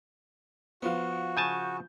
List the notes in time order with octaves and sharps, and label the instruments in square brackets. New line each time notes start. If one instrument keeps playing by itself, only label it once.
[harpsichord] F3 [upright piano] B3 F4 [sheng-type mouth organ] F#4
[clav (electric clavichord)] C#3 G#5 A5 [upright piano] G6